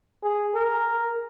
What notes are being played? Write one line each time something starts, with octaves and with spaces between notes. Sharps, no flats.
G#4
A#4